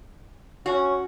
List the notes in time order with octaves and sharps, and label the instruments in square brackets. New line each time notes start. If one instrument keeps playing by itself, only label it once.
[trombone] C#4 [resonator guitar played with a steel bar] F#4